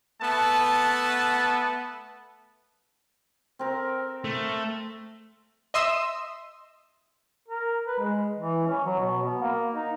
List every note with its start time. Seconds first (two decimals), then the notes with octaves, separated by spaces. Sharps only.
0.22 A3 B3 A5
3.59 C4 A#4
4.24 A3
5.74 D#5 E5 C6 D#6 E6
7.48 A#4
7.87 B4
7.99 G#3
8.39 E3
8.68 C#4
8.85 F#3
8.99 B2
9.24 B3
9.42 A#3
9.74 D#4